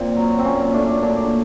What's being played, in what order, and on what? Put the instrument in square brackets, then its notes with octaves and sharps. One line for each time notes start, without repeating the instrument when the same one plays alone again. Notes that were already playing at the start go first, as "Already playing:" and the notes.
Already playing: [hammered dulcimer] A#2 C4
F#3
C4
A#2 C#4
A3 D4
A#2 D4